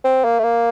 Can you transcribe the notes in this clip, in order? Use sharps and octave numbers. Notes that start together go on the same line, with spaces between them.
C4
A#3
A3
A#3